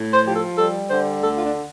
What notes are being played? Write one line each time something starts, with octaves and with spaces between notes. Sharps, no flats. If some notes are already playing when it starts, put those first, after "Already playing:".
Already playing: A2
C5
F3 G4
A4
G3 A4
D3 C5
D2 A4
F4
D4